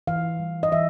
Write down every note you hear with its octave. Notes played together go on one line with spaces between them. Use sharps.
E3 F5
G3
D#5
E3 E5